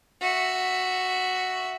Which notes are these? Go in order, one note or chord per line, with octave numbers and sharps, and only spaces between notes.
F#4 E5